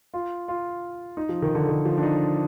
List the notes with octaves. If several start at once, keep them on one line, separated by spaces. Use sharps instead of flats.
F4
F4
D#4
F3
D#3
D3
D#3
F3
D4
D#4